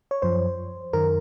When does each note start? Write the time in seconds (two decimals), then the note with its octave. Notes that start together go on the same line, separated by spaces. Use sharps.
0.11 C#5
0.22 F#2 F3 C5
0.93 F#2 D#3 A#4